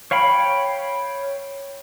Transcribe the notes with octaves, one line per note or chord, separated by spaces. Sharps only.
C#5 F5 G5 B5